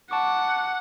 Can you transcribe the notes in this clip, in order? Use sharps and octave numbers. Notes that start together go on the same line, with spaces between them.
F#5 A5 C#6 D6